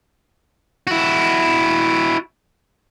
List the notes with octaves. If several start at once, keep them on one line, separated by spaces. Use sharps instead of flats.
E4 F#4